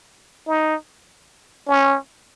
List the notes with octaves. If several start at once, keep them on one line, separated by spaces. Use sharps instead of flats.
D#4
C#4